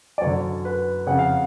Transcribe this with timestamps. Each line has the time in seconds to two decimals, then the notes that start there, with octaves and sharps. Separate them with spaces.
0.18 D5
0.21 F#2 D3 C#5
0.65 B4
1.07 F2 C#3 F#5
1.19 F5